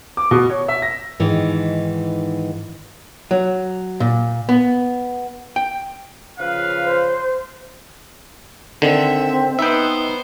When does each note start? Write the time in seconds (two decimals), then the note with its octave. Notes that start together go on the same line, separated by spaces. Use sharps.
0.17 D6
0.31 B2
0.50 C#5
0.68 E5
0.82 A#6
1.20 G#2 D#3 E3
3.31 F#3
4.00 A#2
4.49 B3
5.56 G5
6.38 C#3 F3 B4 F5
6.85 C5
8.82 D3 D#3 C4 E5
9.59 B3 D#4 C5 E5 G5